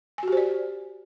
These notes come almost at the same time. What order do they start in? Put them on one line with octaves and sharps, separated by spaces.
G#5 F#4 G4 C5 D5